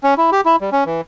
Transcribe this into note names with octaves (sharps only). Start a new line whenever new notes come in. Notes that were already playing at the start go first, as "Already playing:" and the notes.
C#4
E4
G4
E4
G3
C#4
E3